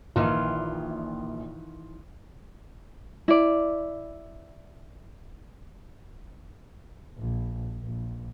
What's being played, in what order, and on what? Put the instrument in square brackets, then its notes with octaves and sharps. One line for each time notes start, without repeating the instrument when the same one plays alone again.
[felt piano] A#1 [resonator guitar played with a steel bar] D#3 E3 F4
[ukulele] E4 D5
[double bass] A#1
A#1